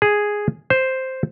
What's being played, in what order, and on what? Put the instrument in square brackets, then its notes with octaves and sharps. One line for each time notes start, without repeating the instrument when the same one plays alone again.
[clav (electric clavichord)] G#4
C5